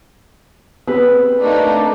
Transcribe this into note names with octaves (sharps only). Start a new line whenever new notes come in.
B3 C4 G4 B4 E6
A3 A#3 D4 D#4